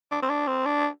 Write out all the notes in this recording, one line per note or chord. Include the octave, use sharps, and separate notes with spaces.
D4
C4
D4
C4
D4